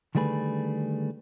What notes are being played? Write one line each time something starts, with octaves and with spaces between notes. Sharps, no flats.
D3 D#3 G3 A3 G#4 B4